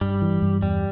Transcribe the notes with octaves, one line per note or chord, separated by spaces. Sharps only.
G2 G3
E3
G2
E2 G3